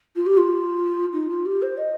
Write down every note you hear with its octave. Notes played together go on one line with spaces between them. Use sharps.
F4
G4
F4
D#4
F4
G4
C5
D#5